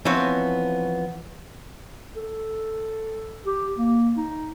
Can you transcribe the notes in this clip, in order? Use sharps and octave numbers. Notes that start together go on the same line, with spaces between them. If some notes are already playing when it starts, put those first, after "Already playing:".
E3 F3 B3 C4 C#5
A4
G4
A#3
D#4